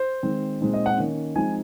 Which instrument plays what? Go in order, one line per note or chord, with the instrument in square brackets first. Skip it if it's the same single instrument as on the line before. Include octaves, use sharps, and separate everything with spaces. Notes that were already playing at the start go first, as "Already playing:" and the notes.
Already playing: [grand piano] C5
D#3 G#3 C4
A#2 G#3 C4 D#4
D#5
F#5
D#3 A#3 C#4
F3 G#3 C4 D#4 G#5